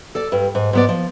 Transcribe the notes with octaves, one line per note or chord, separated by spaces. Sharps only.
A4 D5
G2
G#2
G#2 B3 D5
F3